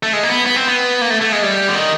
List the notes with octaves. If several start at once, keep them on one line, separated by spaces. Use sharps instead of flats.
A3
G#3
A#3
B3
B3
C4
B3
A#3
A3
A3
G#3
G3
D3
D#3